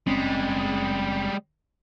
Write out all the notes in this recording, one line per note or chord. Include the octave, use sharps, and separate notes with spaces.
F#1 G3 G#3 C4 C#4